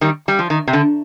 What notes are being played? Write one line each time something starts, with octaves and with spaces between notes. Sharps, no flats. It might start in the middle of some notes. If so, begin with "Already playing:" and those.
D#3 G3
G3
F3
D#3
C3
D3